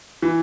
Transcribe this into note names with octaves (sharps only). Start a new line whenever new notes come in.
E3